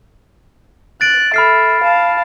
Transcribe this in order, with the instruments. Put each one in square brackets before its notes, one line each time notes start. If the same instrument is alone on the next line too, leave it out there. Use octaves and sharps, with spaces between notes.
[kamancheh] F#6 [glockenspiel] A6 D7
[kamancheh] A4 E5 [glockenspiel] B5 F6 C7
[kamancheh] F5 A5